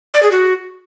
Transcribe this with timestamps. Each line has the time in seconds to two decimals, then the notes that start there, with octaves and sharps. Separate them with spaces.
0.14 D5
0.23 G#4
0.31 F#4